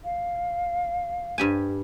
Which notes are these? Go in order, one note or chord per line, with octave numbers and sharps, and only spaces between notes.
F5
G2 G4 G#5